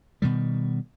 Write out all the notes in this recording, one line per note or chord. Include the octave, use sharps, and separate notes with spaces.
B2 D#3 G3